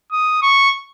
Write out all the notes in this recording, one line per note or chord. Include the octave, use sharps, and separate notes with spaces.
D#6
C#6